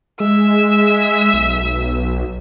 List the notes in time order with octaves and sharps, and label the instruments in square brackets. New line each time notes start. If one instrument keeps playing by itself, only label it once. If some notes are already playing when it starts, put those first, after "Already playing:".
[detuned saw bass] G#3 [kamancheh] E5 E6
[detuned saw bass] B1